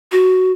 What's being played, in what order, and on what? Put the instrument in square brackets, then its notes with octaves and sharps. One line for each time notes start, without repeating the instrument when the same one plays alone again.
[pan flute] F#4